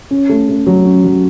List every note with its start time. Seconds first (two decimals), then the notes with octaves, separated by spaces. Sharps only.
0.11 C#4
0.29 A3
0.49 A3
0.67 F#3
0.85 C#4
1.04 F#3